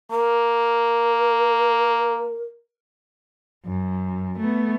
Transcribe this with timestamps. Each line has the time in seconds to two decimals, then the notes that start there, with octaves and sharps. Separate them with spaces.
0.11 A#3 A#4
3.66 F#2
4.38 A3 B3